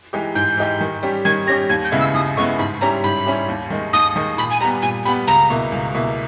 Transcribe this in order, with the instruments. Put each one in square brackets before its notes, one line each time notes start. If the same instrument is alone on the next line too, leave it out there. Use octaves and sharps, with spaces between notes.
[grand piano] E3 G#3 D#4 G4
[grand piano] G#2 [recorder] G6
[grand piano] E3 G#3 D#4 G4
D#3
G3 C#4 G4
[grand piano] D#3 [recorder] G#6
[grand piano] G3 C#4 G4 [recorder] A#6
[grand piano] D#2 [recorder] G#6
[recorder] G6
[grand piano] C#3 G#3 B3 E4
[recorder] E6
[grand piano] D#2 [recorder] D#6
[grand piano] C#3 G#3 B3 E4 [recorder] C#6
[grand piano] G#2 [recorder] B5
[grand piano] G3 C#4 E4 G4 [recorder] A#5
[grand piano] G#2 [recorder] B5
[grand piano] G3 C#4 E4 G4
D#2
D#3 G#3
[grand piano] D#2 [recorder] D#6
[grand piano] D#3 G#3
[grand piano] A#2 [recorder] B5
[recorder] G#5
[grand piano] G3 [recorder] A#5
[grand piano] B3
[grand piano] A#2 [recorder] G#5
[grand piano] G3 [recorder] B5
[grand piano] B3
[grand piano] C#2 [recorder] A#5
[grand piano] B2 A#3 E4
C#2
B2 A#3 E4